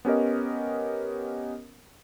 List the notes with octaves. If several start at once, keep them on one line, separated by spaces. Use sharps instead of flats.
B3 C#4 G4 A#4 D#5